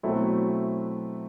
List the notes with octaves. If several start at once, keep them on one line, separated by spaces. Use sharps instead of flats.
B2 F#3 A3 C4 E4